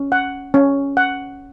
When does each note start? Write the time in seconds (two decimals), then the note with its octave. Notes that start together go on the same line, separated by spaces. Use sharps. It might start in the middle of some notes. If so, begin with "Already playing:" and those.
Already playing: C#4
0.12 F#5
0.54 C#4
0.97 F#5